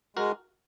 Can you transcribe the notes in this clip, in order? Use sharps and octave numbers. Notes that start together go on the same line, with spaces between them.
G#3 F#4 A#4